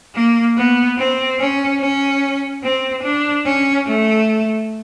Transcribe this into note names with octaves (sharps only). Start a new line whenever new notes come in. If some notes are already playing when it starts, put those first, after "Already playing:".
A#3
B3
C4
C#4
C#4
C4
D4
C#4
A3